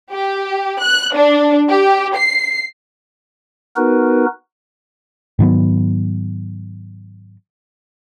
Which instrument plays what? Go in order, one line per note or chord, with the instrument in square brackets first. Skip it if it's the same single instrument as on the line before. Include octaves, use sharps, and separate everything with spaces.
[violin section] G4
F#6
D4
G4
C7
[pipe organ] B3 D#4 F#4 A#4 B4
[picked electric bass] G#2 D#3 F#3 B3